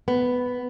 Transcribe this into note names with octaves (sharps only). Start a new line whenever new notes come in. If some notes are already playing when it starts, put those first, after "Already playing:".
B3